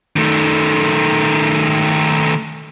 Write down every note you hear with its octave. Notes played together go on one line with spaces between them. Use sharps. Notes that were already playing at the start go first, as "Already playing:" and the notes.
D#3 A3